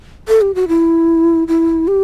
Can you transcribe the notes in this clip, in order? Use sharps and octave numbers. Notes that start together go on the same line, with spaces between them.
A4
G4
F#4
E4
E4
G4